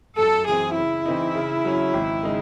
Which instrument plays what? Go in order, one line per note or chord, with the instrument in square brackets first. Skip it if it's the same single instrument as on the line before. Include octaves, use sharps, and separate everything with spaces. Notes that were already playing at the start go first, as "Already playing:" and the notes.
[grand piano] F#2 [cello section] A4
[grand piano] E3 C4 [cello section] G#4
[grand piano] C#3 [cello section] E4
[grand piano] E3 C4 D#4
C#3
F#3 C#4
G#1
C#3 G#3 D#4